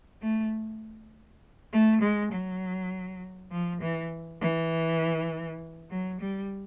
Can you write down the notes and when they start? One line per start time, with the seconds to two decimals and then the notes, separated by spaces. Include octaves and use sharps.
0.22 A3
1.73 A3
2.02 G#3
2.33 F#3
3.52 F3
3.82 E3
4.41 E3
5.90 F#3
6.21 G3